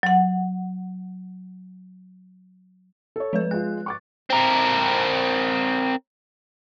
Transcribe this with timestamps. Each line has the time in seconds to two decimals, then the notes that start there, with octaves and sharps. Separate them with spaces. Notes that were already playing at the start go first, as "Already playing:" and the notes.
0.03 F#3 F#5
3.16 A4 C#5
3.33 F3 G#3 B4
3.51 G#3 F4 F#6
3.86 C#6 D6 A6
4.30 C4 A#4